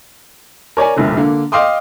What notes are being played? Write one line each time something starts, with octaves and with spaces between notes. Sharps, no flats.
A#4 C#5 D5 G#5
E1 A#1 D3
D3 A#3
D#5 F5 G5 C6 D6 D#6